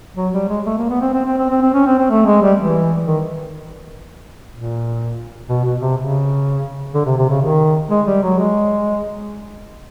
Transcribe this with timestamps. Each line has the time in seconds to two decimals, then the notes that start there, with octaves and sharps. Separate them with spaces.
0.17 F#3
0.33 G3
0.49 G#3
0.66 A3
0.78 A#3
0.90 B3
1.01 C4
1.14 C4
1.25 C4
1.38 C4
1.50 C4
1.62 C4
1.74 C#4
1.86 C4
1.98 C4
2.10 A3
2.26 G#3
2.42 G3
2.59 E3
3.07 D#3
4.52 A#2
5.49 B2
5.64 B2
5.81 C3
5.97 C#3
6.94 D3
7.06 C3
7.18 C3
7.30 C#3
7.42 D#3
7.90 G#3
8.07 G3
8.23 F#3
8.39 G#3